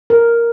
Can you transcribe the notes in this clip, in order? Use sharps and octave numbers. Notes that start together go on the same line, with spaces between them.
A#4